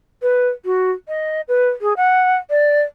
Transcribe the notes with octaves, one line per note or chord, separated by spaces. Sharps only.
B4
F#4
D#5
B4
G#4
F#5
D5